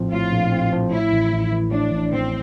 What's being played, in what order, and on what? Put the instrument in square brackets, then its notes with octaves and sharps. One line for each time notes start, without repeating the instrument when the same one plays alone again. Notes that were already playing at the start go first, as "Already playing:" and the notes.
Already playing: [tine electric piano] A#1 A2 F3 C4
[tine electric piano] A2 [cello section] F4
[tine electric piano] A#1
C4
F3
[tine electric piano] A2 [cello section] E4
[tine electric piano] A1
A1
E3
[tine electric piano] A2 [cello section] D4
[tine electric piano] A1
[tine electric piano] A1 [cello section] C4